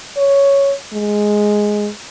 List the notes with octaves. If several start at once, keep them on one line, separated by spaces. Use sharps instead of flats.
C#5
G#3